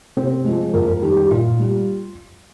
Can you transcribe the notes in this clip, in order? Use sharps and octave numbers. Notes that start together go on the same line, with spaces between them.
C3 C4
F3 G#3
F2 A#4
A#4
D#3 G3 G4
G4
A#2 F4
G3